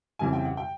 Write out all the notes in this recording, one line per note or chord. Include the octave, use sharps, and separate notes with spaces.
F2 C#3 E3 G3 G#5
G5
F#5
G5